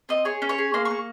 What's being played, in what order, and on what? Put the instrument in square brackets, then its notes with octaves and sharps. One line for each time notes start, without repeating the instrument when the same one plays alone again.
[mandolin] C4 D#5
G#4 C#5
C#4
C#5
G#4
A#3 C6
C#6
A#3